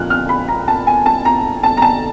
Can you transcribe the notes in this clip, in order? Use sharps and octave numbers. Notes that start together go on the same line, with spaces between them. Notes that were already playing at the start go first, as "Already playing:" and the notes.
Already playing: A#2 F3 F6 F#6
F6
B5
A#5
A5
G#5
A5
A#5
A5
A#5
A5